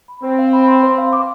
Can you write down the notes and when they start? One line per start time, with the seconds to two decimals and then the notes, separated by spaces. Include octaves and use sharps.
0.08 B5
0.23 C4 C5
0.38 F5
0.53 B5
0.68 C6
0.83 C5
0.98 F5
1.13 D6